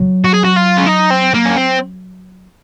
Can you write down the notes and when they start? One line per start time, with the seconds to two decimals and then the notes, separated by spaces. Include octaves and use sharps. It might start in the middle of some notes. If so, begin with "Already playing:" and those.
Already playing: F#3
0.25 F#4
0.34 G#4
0.44 F#4
0.56 F4
0.77 C#4
0.86 D#4
1.10 C4
1.34 A#3
1.45 C#4
1.57 C4